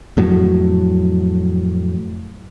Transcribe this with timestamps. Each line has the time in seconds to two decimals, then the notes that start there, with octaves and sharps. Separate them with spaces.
0.17 F2 A2 F#3